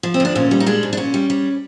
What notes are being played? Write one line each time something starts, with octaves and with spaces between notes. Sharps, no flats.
F3
C4
D2 D4
A#2 C#4
G3
D#4
G#3 D4
G#2
D4
A#2 C#4
G3
G3